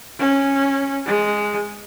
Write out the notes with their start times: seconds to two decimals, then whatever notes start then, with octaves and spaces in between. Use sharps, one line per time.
0.19 C#4
1.06 G#3